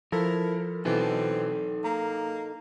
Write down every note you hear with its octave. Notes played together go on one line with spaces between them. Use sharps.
F3 E4 A4 A#4
B2 E3 C4 D#4 A4
A#3 A#5